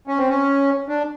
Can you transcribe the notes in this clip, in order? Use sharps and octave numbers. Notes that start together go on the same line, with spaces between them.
C#4
C4
C#4
D4